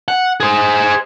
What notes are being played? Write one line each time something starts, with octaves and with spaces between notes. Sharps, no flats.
F#5
G#4 C5